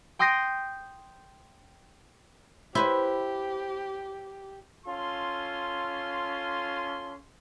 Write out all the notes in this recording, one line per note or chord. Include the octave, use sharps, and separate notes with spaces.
G5 C6 D#6 G6 A#6 C7
E4 G4 B4 C5
C#4 F4 A4 C6